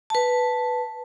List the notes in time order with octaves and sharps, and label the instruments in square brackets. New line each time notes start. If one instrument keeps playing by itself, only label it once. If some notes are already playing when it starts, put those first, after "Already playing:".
[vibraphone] B4 A5